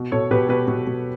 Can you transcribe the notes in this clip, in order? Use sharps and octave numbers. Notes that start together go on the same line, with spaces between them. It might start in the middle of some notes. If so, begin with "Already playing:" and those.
Already playing: B2
B2 A4 C#5
B2 G4 B4
B2 G4 B4
B2
B2